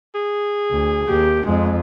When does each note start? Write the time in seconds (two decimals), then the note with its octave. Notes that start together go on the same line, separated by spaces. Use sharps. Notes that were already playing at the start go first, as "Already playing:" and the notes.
0.15 G#4
0.71 D2
1.09 D#2 G4
1.46 F2 G#3